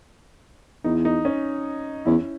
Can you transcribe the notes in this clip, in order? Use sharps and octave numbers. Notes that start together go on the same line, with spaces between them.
E2 D#4
D#4
C#4
E2 C#4 E4